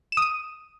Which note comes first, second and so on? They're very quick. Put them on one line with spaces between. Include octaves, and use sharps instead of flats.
E7 D#6 D#7